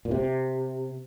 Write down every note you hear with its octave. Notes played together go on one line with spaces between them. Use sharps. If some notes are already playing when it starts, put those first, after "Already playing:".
A#2
C3